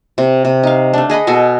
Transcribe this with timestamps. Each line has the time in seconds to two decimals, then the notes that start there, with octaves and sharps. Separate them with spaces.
0.18 C3
0.45 C3
0.63 D#4 F5
0.93 A3 D4
1.10 G#4 D#5 F#5 B5
1.27 B2 F#4 A4 G#5